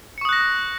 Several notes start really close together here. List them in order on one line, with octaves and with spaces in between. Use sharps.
C#7 C#6 D#6 F#6 A#6